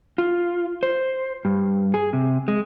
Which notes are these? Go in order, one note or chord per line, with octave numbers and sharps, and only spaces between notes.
F4
C5
G2
G#4
C3
G#3